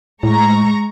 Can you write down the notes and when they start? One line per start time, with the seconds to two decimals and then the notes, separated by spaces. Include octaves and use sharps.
0.23 A2 G#3 A#5 C#6